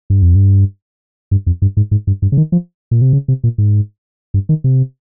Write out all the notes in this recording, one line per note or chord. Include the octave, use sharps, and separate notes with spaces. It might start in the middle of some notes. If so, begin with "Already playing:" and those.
G2
F2
G2
G2
F2
G2
G#2
G#2
G2
G2
C#3
D#3
F3
A#2
C3
C#3
C3
A#2
G#2
G2
D#3
C3